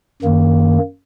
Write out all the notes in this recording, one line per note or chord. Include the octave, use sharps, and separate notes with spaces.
F#2 D#3 A#3